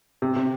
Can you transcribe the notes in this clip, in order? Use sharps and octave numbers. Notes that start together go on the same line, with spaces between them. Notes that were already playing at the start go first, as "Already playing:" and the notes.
C3
C3